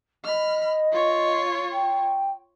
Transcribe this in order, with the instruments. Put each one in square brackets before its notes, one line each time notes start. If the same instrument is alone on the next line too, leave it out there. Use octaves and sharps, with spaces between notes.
[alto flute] D#5 [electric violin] B5 F6
[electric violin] F4 C#5
[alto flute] G5